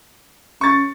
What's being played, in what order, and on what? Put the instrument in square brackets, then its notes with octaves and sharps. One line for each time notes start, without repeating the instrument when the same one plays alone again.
[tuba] C#4 [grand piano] C#6 A6